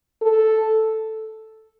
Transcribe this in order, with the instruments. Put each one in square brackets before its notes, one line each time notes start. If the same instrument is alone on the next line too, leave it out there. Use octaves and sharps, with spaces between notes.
[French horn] A4